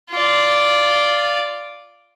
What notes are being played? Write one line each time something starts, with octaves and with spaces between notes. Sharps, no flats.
F4 D5